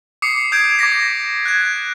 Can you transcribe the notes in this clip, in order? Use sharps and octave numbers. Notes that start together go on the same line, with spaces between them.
D6 D#6 C7 C#7
D#6 G6 G#6 D7
D6 G#6 A#6 B6
F#6 G#6